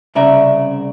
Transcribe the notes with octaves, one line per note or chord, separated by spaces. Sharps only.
C2 C#3 D5 E5 A#5